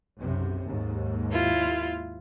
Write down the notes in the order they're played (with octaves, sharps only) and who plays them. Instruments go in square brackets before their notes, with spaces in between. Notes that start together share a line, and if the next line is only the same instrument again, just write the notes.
[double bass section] B1 F#2 C3
D#2 G#2
[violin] E4 F4